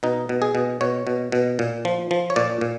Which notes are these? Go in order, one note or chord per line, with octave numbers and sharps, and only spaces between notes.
B2 D#4
B2
G#4
B2
B2 C#5
B2
B2
A#2
F3
F3
C#5
A#2 D5
A#2